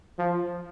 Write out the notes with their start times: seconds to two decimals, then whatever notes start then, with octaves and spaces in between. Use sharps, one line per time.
0.19 F3